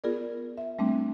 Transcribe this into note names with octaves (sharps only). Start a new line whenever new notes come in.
B3 F4 G#4 A#4 D5
E5
G3 A3 C4 D4